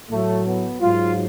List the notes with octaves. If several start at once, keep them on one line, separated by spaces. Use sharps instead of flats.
A2 F#3 A3
B3
G#2 F#3 F4